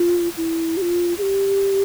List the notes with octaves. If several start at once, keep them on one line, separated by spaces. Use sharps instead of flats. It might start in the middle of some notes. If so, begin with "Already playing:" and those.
Already playing: F4
E4
G4
F4
G#4
G4